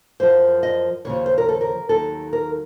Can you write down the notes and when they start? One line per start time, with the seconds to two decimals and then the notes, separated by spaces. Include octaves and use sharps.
0.20 F#2 F3 C5
0.63 D#5
1.05 D#2 C#3 F3 C#5
1.26 C5
1.38 A#4
1.49 A4
1.61 A#4
1.89 D#2 D#3 F#3 A4
2.33 A#4